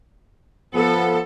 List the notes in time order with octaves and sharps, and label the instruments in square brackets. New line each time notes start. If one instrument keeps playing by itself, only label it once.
[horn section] F3 B3 [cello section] A4